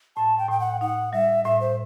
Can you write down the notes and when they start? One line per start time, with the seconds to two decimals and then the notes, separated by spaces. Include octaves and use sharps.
0.16 A2 A5
0.38 G5
0.48 A2 G5
0.60 F#5
0.81 D#4 F#5
1.13 G3 E5
1.45 A2 E5
1.61 C5